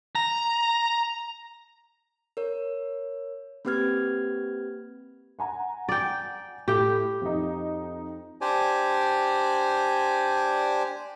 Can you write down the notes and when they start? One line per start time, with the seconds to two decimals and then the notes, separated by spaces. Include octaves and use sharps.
0.15 A#5
2.37 A#4 C#5
3.65 A#3 C4 G4 B4 F6 G#6
5.39 F#5 G#5 A#5
5.89 D5 G5
6.68 A2 G4 G5
7.21 F2 D#4
8.41 D4 G4 C5 D5 G#5